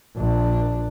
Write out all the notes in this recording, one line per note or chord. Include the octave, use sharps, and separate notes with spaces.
A#1 D4